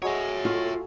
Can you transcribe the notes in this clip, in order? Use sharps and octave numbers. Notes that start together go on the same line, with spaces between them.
F#3 G#3 G#4 C#5 E5
A3 F4